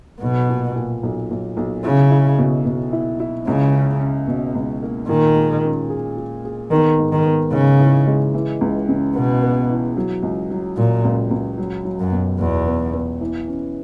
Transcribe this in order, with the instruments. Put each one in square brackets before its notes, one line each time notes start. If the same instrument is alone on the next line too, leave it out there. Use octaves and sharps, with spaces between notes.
[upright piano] B1 [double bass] B2
[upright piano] A#2
A#2
B1
B1
B1
[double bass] C#3 [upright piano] E4
[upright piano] E4
B2
B2
E4
E4
[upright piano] C#2 [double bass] C#3
[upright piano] C#4
C#4
B2
C#2
A#3
[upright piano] A#2 [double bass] D#3
[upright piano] G#3
C#4
G#4
G#4
G#4
[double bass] D#3 [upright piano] B3
[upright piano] G#2
[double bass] D#3
[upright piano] B3
[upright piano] G#2 [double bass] C#3
[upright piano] E3
G#3
E3
C#2
C#3
[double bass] B2 [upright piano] B3
[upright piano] B3
E3
F#3
C#2
F#3
[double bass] A#2 [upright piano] F#3
[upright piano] C#2
C#2
F#3
F#3
[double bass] F#2
[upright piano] B2
[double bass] E2 [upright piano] B2
[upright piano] B3
B3
E3
C#4